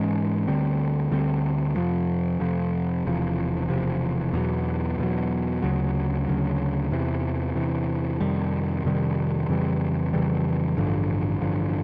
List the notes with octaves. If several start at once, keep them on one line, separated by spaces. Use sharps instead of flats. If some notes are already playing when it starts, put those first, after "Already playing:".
Already playing: G#2 E3 G#3 C#4
D2 D3 G3 C4
D2 D3 G3 C4
F2 C3 F3
F2 C3 F3
E1 E2 C3 F3
E1 E2 C3 F3
E2 B2 F#3
E2 B2 F#3
D2 C#3 F#3
D2 C#3 F#3
E2 C3 E3
E2 C3 E3
F2 C3 D#3 G3
F2 C3 D#3 G3
F2 C#3 E3 G3
F2 C#3 E3 G3
A1 G2 D3 F3
A1 G2 D3 F3